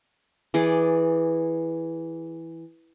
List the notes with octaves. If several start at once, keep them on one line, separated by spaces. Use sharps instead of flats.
E3 G#4 D5